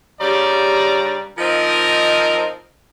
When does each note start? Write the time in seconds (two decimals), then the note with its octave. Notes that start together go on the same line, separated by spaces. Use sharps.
0.20 G2 C#3 G3 D5 A#5
1.38 F3 C4 D#4 A#4 D#5